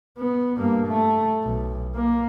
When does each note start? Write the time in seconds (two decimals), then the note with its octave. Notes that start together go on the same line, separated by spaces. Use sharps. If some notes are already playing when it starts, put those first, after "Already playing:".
0.18 B3
0.57 G2 A#3
0.87 A3
1.44 B1
1.95 A#3